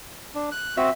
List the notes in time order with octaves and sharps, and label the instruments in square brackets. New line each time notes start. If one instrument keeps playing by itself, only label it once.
[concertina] D4
F#6
[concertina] C4 F#4 [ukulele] E5